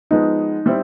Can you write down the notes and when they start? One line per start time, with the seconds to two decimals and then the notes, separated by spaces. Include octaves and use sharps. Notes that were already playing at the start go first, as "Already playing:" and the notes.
0.11 F3 G#3 B3 D#4
0.66 G3 C4 E4